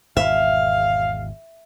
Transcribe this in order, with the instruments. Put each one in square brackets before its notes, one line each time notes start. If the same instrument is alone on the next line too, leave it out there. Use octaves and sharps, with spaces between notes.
[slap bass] G#1 E2 B2 [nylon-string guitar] E5 [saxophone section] F5